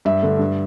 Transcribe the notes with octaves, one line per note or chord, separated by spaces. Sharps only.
G2 E5
D3 A3
G2